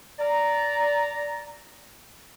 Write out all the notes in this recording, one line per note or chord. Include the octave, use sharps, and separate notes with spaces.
D5 A#5